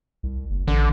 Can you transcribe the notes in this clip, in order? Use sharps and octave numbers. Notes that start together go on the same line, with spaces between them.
C2
F#1
A1 D3